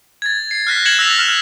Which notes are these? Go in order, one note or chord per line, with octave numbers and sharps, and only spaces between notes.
G#6 A6
C7
F6 F#6 A#6 B6
F#6 G#6 C#7 E7 F#7
E6 F#6 G#6 A#6 B6 F7
F6 F#6 E7